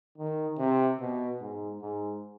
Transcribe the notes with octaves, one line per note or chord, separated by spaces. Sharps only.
D#3
C3
B2
G#2
G#2